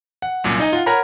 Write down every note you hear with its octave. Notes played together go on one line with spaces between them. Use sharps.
F#5
C2 F#2 A#2
D#4 D#5 G#5
F4 F#5
A#4 C#5 F#5 G#5 A#5 B5